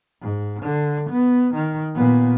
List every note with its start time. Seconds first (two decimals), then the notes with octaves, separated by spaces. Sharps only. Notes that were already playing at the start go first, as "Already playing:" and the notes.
0.21 G#2
0.63 D3
1.10 B3
1.54 D#3
1.95 A#2 B3